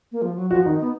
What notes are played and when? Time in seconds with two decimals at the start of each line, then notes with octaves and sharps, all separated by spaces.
0.12 A#3
0.22 F3
0.36 F#3
0.51 F3 F#4
0.65 D#3 D#4
0.80 B3